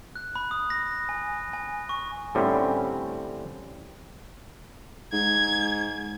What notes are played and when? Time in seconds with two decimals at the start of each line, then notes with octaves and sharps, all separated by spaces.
0.16 F#6
0.36 B5
0.51 D#6
0.70 A#6
1.09 G#5
1.53 G#5
1.89 C#6
2.35 A2 D3 G3 C4 C#4
5.13 G#2 G#6